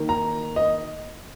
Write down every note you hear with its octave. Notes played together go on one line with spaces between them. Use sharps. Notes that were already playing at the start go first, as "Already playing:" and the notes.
Already playing: D#3 A#3
A#5
D#5